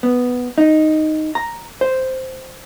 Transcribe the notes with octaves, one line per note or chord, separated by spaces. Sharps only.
B3
D#4
A#5
C5